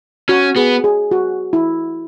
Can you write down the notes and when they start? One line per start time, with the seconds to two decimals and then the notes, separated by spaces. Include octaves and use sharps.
0.29 C#4 F#4
0.56 B3 G#4
0.84 G#4
1.11 F#4
1.53 E4